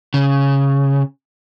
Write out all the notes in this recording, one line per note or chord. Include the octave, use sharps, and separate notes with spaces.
C#3